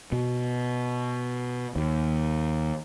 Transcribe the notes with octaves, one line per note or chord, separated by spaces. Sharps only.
B2
D#2